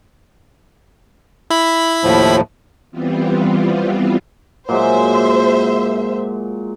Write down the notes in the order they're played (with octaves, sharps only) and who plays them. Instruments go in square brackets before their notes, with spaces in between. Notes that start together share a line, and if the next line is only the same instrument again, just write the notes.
[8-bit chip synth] E4 B5
[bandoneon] D#2 A2 F3
[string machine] E3 G3 B3 C4 F4
[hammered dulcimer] A#2 F#3 G#3 [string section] C5 E5